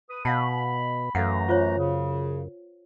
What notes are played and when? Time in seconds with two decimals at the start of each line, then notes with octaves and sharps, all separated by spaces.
0.10 B4 D#6
0.25 B2 F5 F#5 A5 B5
1.15 F#2 E3 A3 A4 F5 F#5 A#5
1.49 F4 C5 C#5
1.78 C#3